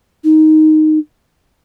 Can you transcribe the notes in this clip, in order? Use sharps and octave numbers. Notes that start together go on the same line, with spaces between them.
D#4